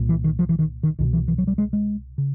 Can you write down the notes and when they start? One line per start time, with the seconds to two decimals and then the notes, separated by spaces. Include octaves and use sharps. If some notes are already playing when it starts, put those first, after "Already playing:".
Already playing: C2 A#2
0.09 E3
0.24 D#3
0.39 F3
0.49 E3
0.59 D#3
0.83 D#3
0.99 C2 B2 D#3
1.13 E3
1.28 E3
1.38 F#3
1.47 G3
1.58 G#3
1.73 G#3
2.18 C#3